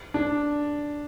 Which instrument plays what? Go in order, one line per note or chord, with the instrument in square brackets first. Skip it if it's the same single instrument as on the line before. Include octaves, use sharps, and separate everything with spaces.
[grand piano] D4